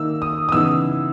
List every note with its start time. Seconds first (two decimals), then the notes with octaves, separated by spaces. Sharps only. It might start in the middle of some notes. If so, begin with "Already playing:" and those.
Already playing: D#3 A#3 D#4 E6
0.22 D#6
0.49 D#6
0.52 C#3 E3 B3 D#4 E6